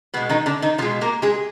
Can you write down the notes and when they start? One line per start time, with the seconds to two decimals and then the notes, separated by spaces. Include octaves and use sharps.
0.14 B2 B3
0.17 G#3
0.29 D#3 D#4
0.46 D3 D4
0.62 D#3 D#4
0.78 B2 F3 F4
0.82 G#3
1.01 A#3 A#4
1.22 G#3 G#4